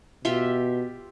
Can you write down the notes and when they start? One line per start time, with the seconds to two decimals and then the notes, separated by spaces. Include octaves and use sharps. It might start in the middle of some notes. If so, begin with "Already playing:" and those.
0.25 B2 F4 G4 E5